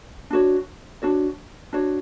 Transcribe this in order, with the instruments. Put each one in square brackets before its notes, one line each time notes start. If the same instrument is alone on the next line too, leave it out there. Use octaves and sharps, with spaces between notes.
[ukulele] D4 F#4 C#5
D4 F#4 C#5
D4 F#4 C#5